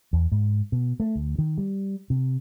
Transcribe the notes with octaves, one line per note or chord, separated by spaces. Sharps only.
E2
G#2
B2
A3
D2
D#3
G3
C3